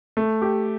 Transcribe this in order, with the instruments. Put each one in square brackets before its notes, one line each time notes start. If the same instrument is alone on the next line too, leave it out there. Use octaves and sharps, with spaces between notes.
[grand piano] A3
G4